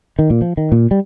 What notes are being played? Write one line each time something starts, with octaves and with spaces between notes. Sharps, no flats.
D#3
A#2
F3
D#3
A#2
G3